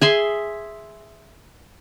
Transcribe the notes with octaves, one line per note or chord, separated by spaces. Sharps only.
G#4 E5 C6